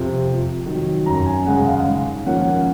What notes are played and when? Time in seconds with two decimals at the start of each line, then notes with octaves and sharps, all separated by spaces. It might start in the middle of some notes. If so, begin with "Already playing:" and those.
Already playing: F2 C3 F3 C4
0.27 C3
0.66 D#3 F#3
1.06 F#2 A#5
1.26 G#5
1.46 C#3 G#3 C#4 F#5
1.66 F5
1.87 G#2
2.26 F3 A#3 C#4 F#5